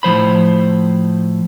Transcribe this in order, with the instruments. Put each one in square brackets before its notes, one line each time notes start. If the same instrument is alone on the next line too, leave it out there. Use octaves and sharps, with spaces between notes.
[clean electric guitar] A2 F3 C5 B5